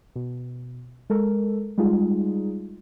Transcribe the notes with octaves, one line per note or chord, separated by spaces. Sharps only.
B2
G#3 A4 A#4
G3 G#3 D#4 F4 G#4